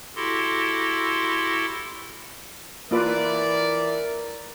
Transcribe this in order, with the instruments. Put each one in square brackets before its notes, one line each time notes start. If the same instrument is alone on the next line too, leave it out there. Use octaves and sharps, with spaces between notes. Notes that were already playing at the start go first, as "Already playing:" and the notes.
[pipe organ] E4 F#4 G4 A4 C6
[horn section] E3 D5 [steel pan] A#3 F4 B4 [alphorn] A#4